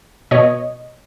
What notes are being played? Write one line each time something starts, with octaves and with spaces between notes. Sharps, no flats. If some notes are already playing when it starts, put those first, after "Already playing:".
B2 C#5 D#5